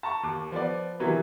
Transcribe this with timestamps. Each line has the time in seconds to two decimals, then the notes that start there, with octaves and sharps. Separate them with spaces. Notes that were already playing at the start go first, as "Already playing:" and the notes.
0.03 A5 A#5 C#6
0.23 D#2 D6
0.52 F3 B3 D5
1.00 C3 D#3 E3 F#3 G3 B3